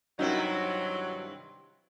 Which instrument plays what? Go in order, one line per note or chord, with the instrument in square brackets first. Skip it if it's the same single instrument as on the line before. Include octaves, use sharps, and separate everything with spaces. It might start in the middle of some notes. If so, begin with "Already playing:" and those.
[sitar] G2 C3 E4 [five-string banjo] D#3 C#4 D#4 [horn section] F#3